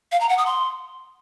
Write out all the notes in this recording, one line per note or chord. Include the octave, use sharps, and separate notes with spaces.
F5
A#5
F#5
D#6
C6